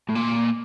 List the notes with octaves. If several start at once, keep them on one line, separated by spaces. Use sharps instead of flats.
A2
A#2